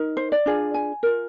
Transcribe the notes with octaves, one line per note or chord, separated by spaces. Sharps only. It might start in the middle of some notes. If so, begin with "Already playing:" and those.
Already playing: D#4 A#4
C5
D5
D4 F4 G#4
G#5
F4 A#4